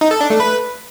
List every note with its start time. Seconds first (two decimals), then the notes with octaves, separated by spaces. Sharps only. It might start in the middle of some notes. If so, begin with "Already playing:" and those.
0.01 D#4
0.11 A4
0.21 D4
0.30 A3
0.40 B4